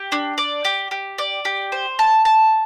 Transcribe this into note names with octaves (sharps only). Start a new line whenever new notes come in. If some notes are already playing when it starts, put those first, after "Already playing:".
Already playing: G4
D4
D5
G4
G4
D5
G4
C5
A5
A5